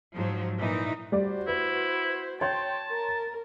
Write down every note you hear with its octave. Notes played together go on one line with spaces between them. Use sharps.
G#2 F3 F#3
A#2 E3 A#3 D#4
G3 F#4 C5 D5
E4 B4
C#5 G5 A5 C6
A#4